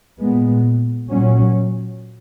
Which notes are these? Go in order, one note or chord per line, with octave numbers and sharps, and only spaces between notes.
A#2 G#3 B3
A#2 F#3 C#4